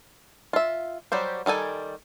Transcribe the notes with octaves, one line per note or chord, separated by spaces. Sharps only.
F4 E5
F#3 G3 G4 C5
D#3 G3 A4 G#5